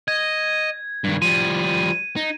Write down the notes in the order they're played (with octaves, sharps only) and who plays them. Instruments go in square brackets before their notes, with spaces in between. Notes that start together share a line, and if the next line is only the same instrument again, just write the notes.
[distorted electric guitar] D#5 [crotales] G#6
[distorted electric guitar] G2 D#3
[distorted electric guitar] F3 G3 [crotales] D#7
[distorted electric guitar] D#4